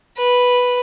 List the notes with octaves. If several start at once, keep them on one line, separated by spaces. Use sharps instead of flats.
B4